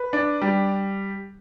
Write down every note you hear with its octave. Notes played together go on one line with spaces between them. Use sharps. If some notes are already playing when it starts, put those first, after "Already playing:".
Already playing: B4
D4
G3